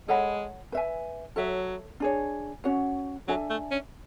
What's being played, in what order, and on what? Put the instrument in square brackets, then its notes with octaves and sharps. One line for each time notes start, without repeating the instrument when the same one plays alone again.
[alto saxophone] G#3 [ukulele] A4 C#5 F#5 B5
[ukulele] B4 E5 G#5
[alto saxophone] F#3 [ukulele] A4 C#5 E5
[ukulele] D4 G#4 C#5
C#4 F#4 C#5 F#5
[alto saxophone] F#3 [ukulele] D4 A4 E5 G#5
[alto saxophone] A3
C#4